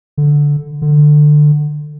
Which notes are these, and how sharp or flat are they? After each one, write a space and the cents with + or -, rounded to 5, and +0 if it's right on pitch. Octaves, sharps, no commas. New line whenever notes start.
D3 -5
D3 +20